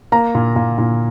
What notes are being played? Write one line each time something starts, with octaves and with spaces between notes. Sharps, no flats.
A#3 A#5
A#2
A#2
A#2